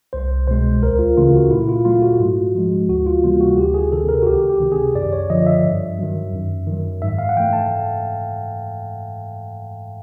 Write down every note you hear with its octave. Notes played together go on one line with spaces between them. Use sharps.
C2 C5
B2 G#3 C5
D2 A#4
F4
C#3 E3 A3 F4
F#4
A#2 E4
F4
F#3 A3 F4
F#4
G#2
F3 G#3
D2 F#4
F4
C3 E3 G3 A#3 F4
F#4
D2 G4
G#4
C3 D#3 A4
A#4
F#4
C#2 G4
G4
C3 D#3
G#4
F#2 D5
C#5
D3 F3 D#5
E5
G2
D#3 F#3
F#2
D#3 F#3
G#2 E5
F5
F#5
E3 A3 G5
A5